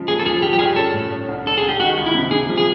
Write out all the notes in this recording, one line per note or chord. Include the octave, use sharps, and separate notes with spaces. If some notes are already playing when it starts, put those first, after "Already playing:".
Already playing: C#3 F3 G#3
D#2 G#4
A4
F3 G#4
F3 G4
G4
G2 G#4
C#4 A4
A2
C#4
C2
C2 A4
G#4
C2
G4
D#3 F#4
C#2
E4
C3
C3 G#4
F3
G#4